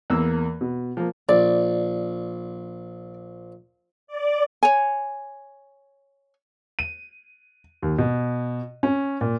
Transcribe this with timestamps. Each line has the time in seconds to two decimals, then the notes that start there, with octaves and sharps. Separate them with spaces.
0.10 E2 A#3 E6
0.61 B2
0.97 F3 A#3
1.29 A#1 D5
4.07 D5
4.63 C#5 G#5
6.79 D#7
7.83 D#2
7.98 B2
8.83 C#4
9.21 A#2